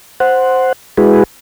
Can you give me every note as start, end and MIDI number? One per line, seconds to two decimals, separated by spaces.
0.20 0.73 72
0.20 0.73 78
0.98 1.24 56
0.98 1.24 64
0.98 1.24 66
0.98 1.24 68
0.98 1.24 71